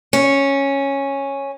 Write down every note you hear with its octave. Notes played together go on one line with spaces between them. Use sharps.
C#4